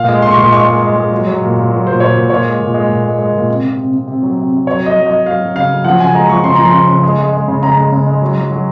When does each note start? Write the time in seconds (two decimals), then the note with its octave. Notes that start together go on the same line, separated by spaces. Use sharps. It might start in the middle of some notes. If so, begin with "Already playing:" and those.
Already playing: A#2 F5
0.08 G#3
0.22 G#3 C6
0.31 C#6
0.38 A#2 C6
0.52 G#3 C#6
0.67 G#3
0.82 G#3
0.97 G#3
1.12 F#3
1.27 F#3
1.41 A#2
1.56 A#2
1.71 F#3
1.86 A#2 C5
2.00 A#2 C#5
2.15 A#2
2.30 A#2 C#5
2.44 G#3
2.60 A#2
2.74 G#3
2.89 A#2
3.04 G#3
3.19 G#3
3.33 A#2
3.49 C3
3.63 C3
3.78 C3
3.92 C3
4.07 C3
4.23 F#3
4.37 C3
4.52 C3
4.67 F#3 C#5
4.81 F#3
4.86 D#5
4.96 F#3
5.06 F#3 D#5
5.26 F#3 F5
5.41 F#3
5.55 C#3 F5
5.70 F#3
5.84 F3 F#5
6.00 C#3 G#5
6.15 G#3 A#5
6.29 F3 C#6
6.44 C#3 C6
6.55 F3 A#5
6.65 C6
6.73 C#3
6.89 C#3
7.03 G#3
7.18 G#3
7.33 G#3
7.48 C#3
7.63 C#3 A#5
7.77 G#3
7.92 C#3
8.07 G#3
8.22 F#3
8.36 F#3
8.51 F#3